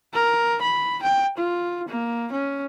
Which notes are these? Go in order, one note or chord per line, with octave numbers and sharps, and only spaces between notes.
A#4
B5
G5
F4
A#3
C#4